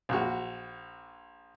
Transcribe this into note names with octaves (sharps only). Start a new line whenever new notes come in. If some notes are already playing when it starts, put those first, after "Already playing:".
A#1 F#4